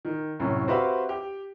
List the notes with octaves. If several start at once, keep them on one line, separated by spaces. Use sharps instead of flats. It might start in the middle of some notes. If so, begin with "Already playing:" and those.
D#3
C2 F#2 A2
C4 F#4 G4 B4 E5 F5
G4